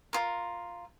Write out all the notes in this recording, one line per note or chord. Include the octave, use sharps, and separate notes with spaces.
F4 A#4